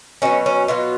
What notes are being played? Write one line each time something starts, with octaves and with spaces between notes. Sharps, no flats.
B2 F#3 C#4
C#4
B2 F#3 F4